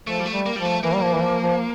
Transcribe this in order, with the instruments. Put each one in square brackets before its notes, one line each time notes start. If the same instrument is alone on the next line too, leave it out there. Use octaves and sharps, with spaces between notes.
[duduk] F3 [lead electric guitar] A3
[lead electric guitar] G3
A3
[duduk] G3
[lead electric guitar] A#3
[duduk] F3 [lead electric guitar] G3
[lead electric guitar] A3
[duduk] E3 [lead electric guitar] A#3
[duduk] G3
F3
E3
F3
F3